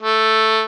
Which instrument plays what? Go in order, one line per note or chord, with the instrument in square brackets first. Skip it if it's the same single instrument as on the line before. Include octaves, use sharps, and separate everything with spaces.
[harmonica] A3